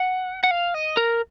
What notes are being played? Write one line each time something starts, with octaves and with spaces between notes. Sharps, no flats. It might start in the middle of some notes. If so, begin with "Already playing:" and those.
Already playing: F#5
F#5
F5
D#5
A#4